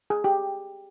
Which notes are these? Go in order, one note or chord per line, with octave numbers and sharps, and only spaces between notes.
G#4
G4